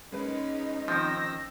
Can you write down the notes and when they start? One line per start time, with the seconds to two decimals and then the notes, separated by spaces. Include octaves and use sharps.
0.12 G#3 A#3 C#4 D#4 B4
0.88 D#3 F3 C4 E6 G6 A#6